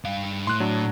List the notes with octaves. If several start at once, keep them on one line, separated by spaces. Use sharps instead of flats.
G2 F5
A2 C6 F#6
F#3 D4